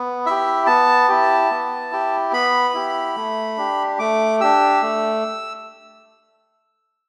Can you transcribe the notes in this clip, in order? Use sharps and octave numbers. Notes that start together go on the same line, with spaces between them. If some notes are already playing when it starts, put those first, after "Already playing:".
Already playing: B3
E4 G4 E5
B3 A5
E4 G4
B3
E4 G4
B3 B5
E4 G4
A3
D4 G4
A3 D6
D4 G4 E6
A3